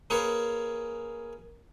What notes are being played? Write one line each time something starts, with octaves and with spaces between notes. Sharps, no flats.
A#3 C#4 G#4 B4 C#5